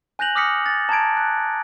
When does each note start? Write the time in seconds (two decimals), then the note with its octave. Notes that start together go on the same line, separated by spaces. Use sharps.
0.19 G#5 F#6 G6 A#6 F7 F#7
0.35 D6 D#6 F6 A#6 B6 C#7
0.66 A6
0.89 A5 A#5 G#6 D7
1.17 F#6